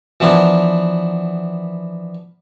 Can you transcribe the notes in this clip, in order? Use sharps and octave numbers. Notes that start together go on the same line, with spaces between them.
E3 F3 B3 D4 A#4